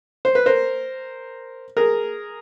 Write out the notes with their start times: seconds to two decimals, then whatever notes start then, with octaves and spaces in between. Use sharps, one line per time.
0.25 C5
0.35 B4
0.46 A#4 C5
1.77 G#4 A#4